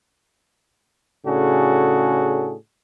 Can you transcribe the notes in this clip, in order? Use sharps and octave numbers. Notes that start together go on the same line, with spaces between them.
A2 C#3 D4 F#4 G#4 A4